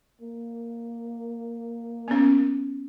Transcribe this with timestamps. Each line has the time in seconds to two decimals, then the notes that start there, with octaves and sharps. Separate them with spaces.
0.22 A#3
2.08 B3 C#4